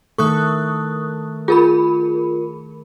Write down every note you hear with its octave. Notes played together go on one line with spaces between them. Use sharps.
D#3 A3 A4 C#6 D#6 F#6
F4 G#4 A#4 B5